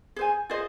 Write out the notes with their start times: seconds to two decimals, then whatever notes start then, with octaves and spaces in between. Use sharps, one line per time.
0.16 G#4 C5 G#5
0.50 F4 G#4 C5 D#5